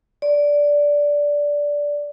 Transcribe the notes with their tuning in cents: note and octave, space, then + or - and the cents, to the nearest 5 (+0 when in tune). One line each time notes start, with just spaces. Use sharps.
D5 -10